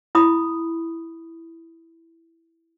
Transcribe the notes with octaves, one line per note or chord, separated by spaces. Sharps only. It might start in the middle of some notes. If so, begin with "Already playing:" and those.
E4 B5 D#6